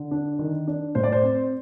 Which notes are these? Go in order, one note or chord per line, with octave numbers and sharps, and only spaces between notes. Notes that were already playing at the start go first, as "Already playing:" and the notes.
Already playing: D3
D4
D#3
D4
A2 C5
D5
C5
C4